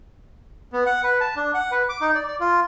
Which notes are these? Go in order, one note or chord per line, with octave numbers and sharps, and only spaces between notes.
B3
F#5
B4
A5
D4
F#5
B4
D6
D#4
D5
D5
F4